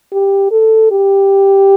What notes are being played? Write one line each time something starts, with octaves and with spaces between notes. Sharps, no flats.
G4
A4
G4